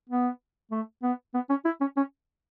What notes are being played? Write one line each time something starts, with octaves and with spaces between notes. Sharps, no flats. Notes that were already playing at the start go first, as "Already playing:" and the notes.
B3
A3
B3
B3
C#4
E4
C#4
C#4